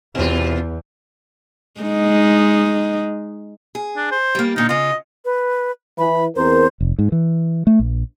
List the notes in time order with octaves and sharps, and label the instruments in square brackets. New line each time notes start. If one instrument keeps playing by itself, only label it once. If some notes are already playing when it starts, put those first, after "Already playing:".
[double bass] E2 [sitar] B2 F4
[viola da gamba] G#3 D#4
[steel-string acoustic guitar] G#4
[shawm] D4
C5
[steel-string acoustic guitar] G3 A#3
[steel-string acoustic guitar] A#2 D3 [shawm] D#4
[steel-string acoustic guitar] C#3 F4 [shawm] D#5
[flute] B4
[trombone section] E3 [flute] B5
[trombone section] E2 C4 A#4 [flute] C5
[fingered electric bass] F1
G#2
E3
A3
A#1